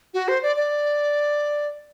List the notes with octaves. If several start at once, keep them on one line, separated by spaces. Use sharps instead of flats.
F#4
C5
D5
D5